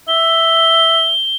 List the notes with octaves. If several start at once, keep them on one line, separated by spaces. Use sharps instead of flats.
E5 G7